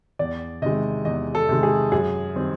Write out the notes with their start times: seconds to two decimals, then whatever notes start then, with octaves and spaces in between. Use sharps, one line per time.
0.19 E2 D5
0.62 C3 D#3 G#3 D#5
1.05 E2 D#5
1.35 A4
1.49 C3 D#3 G#3
1.63 G#4
1.91 F#2 G#4
2.36 D#3 G3 C4